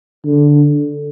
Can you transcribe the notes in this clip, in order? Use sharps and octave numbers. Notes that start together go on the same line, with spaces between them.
D3